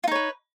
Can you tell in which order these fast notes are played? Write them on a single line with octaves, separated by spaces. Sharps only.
F4 D#4 C#5 B4